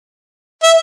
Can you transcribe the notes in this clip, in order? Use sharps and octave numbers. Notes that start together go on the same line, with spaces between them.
E5